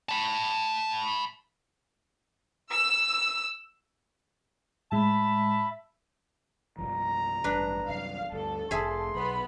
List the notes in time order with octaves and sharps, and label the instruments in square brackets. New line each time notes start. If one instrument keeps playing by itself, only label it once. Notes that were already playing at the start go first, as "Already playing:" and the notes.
[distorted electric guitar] A5 B5
[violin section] E6
[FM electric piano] A2 G#3 [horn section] E5 A5 B5
[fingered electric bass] C2 G2 F3 [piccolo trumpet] A#5
[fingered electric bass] A1 G2 [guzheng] D4 B4
[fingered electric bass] C2 F#2 [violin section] F5
[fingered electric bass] D2 G2 [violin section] A4
[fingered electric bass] F1 [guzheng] G#4 E5 [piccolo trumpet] C6
[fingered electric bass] B1 [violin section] B3 B5